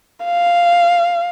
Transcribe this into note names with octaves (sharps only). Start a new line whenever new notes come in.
F5